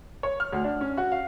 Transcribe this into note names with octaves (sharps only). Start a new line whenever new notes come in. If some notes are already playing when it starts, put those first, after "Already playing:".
C#5
F6
D2
D4
C#4
F#4
F5